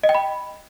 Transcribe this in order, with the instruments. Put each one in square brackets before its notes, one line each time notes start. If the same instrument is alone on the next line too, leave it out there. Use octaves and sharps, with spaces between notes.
[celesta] D#5
G5
B5